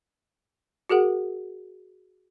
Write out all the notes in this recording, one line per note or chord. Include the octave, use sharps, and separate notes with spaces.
F#4 G#4 A#4 F#5